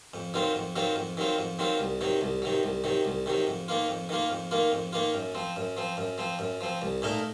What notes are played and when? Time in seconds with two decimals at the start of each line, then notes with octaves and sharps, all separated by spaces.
0.14 F2
0.34 D#3 F#3 C4 F4
0.55 F2
0.76 D#3 F#3 C4 F4
0.96 F2
1.17 D#3 F#3 C4 F4
1.39 F2
1.59 D#3 F#3 C4 F4
1.79 C2
2.01 C3 D#3 F#3
2.21 C2
2.42 C3 D#3 F#3
2.63 C2
2.84 C3 D#3 F#3
3.05 C2
3.26 C3 D#3 F#3
3.47 F2
3.68 D#3 A#3 F4
3.88 F2
4.09 D#3 A#3 F4
4.31 F2
4.51 D#3 A#3 F4
4.72 F2
4.93 D#3 A#3 F4
5.14 F#2
5.35 F3 C4
5.56 F#2
5.77 F3 C4
5.97 F#2
6.18 F3 C4
6.39 F#2
6.61 F3 C4
6.82 C2
7.02 A#2 A3 D#4 A#4